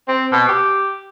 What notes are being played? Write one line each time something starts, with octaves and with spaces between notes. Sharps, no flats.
C4
B2
G4